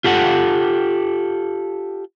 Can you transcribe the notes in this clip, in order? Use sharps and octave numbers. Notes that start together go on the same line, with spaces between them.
F4 G4 A4 F#5